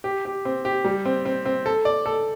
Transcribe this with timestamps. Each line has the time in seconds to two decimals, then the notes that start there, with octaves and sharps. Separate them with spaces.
0.04 G4
0.25 G4
0.45 C4
0.65 G4
0.84 G3
1.05 C4
1.25 C4
1.45 C4
1.66 A4
1.85 D5
2.06 A4